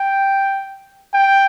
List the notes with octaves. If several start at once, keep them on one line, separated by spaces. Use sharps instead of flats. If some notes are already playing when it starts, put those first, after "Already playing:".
Already playing: G5
G5